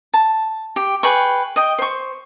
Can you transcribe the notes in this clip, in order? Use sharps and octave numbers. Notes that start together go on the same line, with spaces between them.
A5
G4
G#4 B4 G5 C#6
D#5 G5
C5 C#6